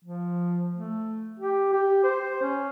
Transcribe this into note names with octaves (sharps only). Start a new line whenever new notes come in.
F3
A3
G4
G4
C5
C#4